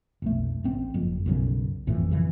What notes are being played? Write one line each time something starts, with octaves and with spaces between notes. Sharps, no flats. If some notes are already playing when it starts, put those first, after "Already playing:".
F1 B1 A3
A1 C4 C#4
F#1 F2
B1 F#2 C#3
A1 F2 A2 E3
F2 C#3 E3